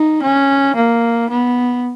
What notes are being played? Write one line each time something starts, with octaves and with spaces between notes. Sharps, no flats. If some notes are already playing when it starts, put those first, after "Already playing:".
Already playing: D#4
C#4
A#3
B3